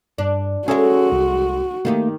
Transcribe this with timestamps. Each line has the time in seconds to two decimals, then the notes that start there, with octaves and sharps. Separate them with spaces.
0.18 G2 D4
0.68 G#3 C#4 F#4 G#4 A4 C#5 E5
1.12 C2
1.85 D#3 A3 A#3 D#4 G4